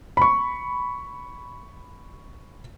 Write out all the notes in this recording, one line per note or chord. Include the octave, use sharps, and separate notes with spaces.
B5 C#6